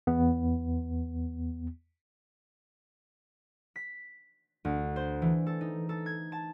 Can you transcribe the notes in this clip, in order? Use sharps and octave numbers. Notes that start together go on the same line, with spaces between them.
E2 B3
B6
D2
C5
E3
A4
D#4
A4
G#6
A5